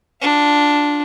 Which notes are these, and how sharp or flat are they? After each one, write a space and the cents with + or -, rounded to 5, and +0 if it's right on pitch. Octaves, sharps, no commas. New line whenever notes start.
D4 +0 F4 +30